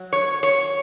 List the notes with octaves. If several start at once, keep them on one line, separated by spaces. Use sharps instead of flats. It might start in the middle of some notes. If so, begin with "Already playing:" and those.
Already playing: F#3
C#5
C#5